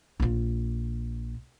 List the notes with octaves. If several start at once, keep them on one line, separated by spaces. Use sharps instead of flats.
A#1 F4